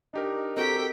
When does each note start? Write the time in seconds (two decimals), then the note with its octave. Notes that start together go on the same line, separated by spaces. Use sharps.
0.14 D4 D#4 G4 A#4
0.57 C4 F#4 G4 A4 A#4 G5 B6